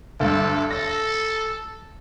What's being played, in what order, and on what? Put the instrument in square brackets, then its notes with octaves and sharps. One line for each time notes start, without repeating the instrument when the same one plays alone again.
[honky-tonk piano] D2 G2 [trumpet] A4
[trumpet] A4 [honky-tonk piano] A#6